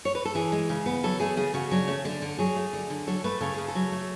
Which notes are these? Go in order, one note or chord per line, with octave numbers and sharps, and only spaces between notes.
C#5
B4
A4
E3 G#4
G#3
C#3
B3
F#3 A4
A3 G#4
C#3 G#4
C#3 F#4
F#3 D4
A3 C#4
D3 D4
D3
F#3 G#4
A3
D3
D3
F#3 A4
A3 B4
C#3 A4
C#3 G#4
A4
F#3
A3